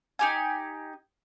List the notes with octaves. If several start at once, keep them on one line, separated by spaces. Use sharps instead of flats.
D#4 G4 G#5